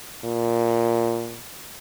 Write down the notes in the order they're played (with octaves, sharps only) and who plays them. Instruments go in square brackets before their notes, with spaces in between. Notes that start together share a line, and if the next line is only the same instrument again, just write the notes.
[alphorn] A#2